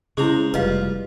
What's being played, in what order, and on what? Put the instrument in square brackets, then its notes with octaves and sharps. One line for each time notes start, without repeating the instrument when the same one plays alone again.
[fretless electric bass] C#3 [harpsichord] G#3 C5 A#5 [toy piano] E4 G#4
[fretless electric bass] F1 [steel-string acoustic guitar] G3 F4 [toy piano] B4 D#5 F5